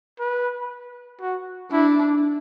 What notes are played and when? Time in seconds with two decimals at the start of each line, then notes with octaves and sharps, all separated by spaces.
0.20 B4
1.21 F#4
1.72 D4 E4